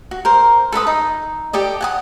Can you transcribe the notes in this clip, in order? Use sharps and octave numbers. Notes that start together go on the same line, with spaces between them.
F#4
A#4 C5
A4 B4 B5 D#6
D#4
G4 A4 D5 D#5
F#5 G#5 D#6